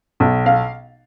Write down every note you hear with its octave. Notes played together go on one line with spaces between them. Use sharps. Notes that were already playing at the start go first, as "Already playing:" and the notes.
B1
F5